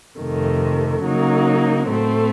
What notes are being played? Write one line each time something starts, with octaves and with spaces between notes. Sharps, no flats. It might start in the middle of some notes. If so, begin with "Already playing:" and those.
F2 C3 D#3 A3
C#3 F#3 A#3 D#4
A2 A3 C4